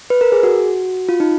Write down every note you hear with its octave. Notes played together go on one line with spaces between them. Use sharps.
B4
A#4
G#4
F#4
F4
D#4